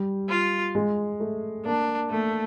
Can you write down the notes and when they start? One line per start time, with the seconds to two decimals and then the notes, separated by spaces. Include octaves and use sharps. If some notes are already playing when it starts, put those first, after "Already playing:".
Already playing: G3
0.30 F4
0.75 G#3
1.20 A3
1.65 A#3 D4
2.10 A3 A#3